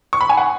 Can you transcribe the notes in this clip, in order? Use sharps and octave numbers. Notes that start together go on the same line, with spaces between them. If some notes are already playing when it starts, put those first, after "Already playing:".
C#6
B5
G#5
F#5